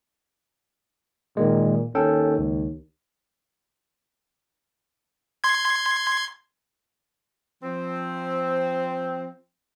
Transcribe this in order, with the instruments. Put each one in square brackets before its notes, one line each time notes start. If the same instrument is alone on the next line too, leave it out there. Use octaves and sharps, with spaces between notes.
[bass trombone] A#2 [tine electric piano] D#3 G#3
[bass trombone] D#2 [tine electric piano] C#4 A4 G5
[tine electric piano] C#2
[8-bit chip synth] C6 G#6
[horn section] F3 C4